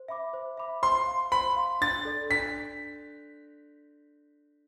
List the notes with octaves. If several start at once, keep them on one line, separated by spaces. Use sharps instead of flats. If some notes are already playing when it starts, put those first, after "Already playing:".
Already playing: C5
E5 B5 D6
C5
E5 B5 D6
C5 C6
F5 C6
C5 B5
F5 C6
D4 A6
A4 D5
D4 B6